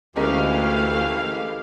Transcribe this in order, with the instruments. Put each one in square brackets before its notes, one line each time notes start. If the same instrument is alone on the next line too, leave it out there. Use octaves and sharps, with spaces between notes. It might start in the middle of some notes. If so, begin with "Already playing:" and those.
[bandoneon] D2 [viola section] E3 A3 F5 [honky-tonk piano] G#3 C#4 A#4 [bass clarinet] G4